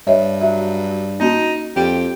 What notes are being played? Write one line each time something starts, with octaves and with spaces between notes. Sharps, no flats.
G2 C#5 D#5 E5
F#3 E5
A#3 C#4 D#4 F#4
F2 G4